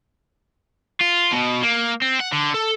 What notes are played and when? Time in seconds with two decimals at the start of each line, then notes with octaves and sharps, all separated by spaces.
1.00 F4
1.32 B2
1.62 A#3
2.02 C4
2.20 F#5
2.33 D3
2.55 A4